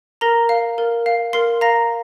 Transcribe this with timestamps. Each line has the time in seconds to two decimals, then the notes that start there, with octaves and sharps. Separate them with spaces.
0.21 A#4 A#5 A#6
0.49 F5
0.78 A#4
1.06 F5
1.33 A#4 C6 C7
1.61 F5 A#5 A#6